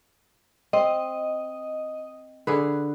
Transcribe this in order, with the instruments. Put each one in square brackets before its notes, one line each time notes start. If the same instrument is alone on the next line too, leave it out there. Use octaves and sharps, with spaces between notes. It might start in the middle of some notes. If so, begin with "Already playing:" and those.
[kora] C4 [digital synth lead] D#5
[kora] D3 G#4 B4